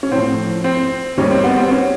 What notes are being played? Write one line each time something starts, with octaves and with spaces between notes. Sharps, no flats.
C#4
A2 F3 C4
C4
D#2 D#3 G3 C#4
C4
B3
C4
C#4